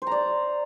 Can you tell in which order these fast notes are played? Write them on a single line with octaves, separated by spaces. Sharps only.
C5 A#5 D5